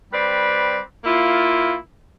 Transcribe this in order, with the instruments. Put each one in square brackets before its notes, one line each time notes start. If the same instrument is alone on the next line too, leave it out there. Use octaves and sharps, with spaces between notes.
[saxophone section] G3 C4 B4 D5
A#3 E4 F4